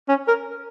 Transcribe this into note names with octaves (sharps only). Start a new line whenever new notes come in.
C#4
A#4